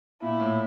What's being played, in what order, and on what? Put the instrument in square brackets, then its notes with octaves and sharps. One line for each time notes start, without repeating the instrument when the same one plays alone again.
[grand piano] A#2 [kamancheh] E4
[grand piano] A2